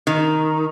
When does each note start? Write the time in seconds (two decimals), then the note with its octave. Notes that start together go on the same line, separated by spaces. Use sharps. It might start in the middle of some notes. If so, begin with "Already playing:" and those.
0.07 D#3